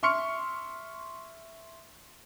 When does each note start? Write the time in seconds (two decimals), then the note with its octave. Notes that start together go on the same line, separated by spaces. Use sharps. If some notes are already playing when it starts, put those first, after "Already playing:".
0.03 E5 C6 C#6 F6 C#7